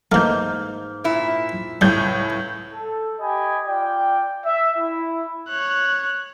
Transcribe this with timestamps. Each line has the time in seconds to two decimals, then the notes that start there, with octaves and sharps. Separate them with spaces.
0.12 G#2 E3 A3 A#3 F6 G6
1.04 A#2 E4
1.81 C#2 A2 G3 G6
2.73 A4
3.20 G4 D#5 G5 G#5 B5
3.66 F4 D5 G5
4.45 E5
4.78 E4
5.48 C#5 F#6